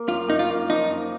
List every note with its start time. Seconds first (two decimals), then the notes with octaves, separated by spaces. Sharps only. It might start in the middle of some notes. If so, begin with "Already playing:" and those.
Already playing: A#3
0.08 F#2 F4
0.28 F#2 D#4
0.39 F4
0.49 A#3
0.70 F3 D#4
0.90 F#2